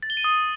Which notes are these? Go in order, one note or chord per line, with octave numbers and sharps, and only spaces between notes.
A6
G7
D#7
D#6